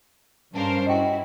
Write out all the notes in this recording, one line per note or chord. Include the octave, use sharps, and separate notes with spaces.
G2 C#4 D4 A#4 C5 F5
E4 F#4 D#5 G5